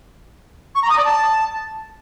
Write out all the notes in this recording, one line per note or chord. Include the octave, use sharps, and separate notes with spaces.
C#6
A#5
D#6
D5
A5